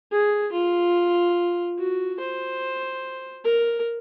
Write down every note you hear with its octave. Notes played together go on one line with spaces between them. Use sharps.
G#4
F4
F#4
C5
A#4